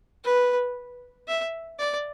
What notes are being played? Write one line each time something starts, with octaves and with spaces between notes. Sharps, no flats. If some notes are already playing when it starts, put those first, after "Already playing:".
B4
E5
D5